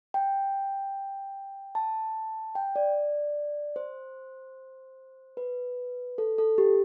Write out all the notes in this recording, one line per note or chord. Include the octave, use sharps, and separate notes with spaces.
G5
A5
G5
D5
C5
B4
A4
A4
G4